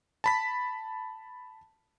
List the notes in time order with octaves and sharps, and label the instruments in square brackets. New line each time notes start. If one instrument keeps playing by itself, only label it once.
[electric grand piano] A5 B5 B6